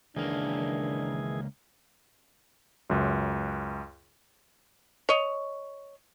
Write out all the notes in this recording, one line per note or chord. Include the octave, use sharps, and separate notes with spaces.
C#2 D#3 E3 A#3 D4 G#4
C#2 F#2
C#5 D#5